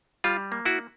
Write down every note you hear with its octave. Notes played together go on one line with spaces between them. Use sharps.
G3 F4
A#3
E4 F#4